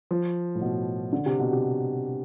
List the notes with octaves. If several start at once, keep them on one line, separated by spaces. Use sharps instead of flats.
F3
A2
B2
D3
C3
B2
C3